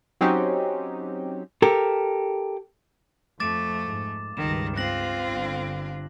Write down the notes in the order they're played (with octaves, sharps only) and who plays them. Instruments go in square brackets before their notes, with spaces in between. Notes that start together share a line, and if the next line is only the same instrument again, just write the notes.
[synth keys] F#3 C4 C#4 D#4 G4
[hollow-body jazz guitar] G4 A4 A#4
[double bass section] F2 [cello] A3 [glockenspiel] D6 A6 E7
[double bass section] G#2
[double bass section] C#2 G2 [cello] D#3 [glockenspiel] E7
[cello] C4 F4 [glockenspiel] F#6 A#6 F#7
[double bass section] G1 D3